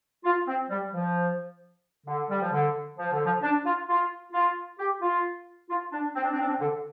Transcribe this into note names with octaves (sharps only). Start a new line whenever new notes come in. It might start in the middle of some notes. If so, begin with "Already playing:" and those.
F4
C4
G3
F3
D3
G3
F3
D3
F3
D3
F3
D4
F4
F4
F4
G4
F4
F4
D4
C4
D4
C4
D4
C4
D3